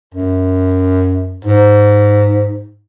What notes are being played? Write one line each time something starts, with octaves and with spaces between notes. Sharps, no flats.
F#2
G#2